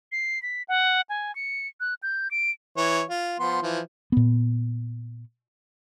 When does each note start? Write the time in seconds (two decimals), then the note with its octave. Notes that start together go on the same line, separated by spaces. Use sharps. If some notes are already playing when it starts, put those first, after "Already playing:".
0.12 C7
0.42 B6
0.68 F#5
1.09 G#5
1.35 C#7
1.80 F#6
2.03 G6
2.31 D7
2.77 E3 C#5
3.10 F4
3.40 F3 B3 C6
3.62 E3 F3
4.12 A#2 B3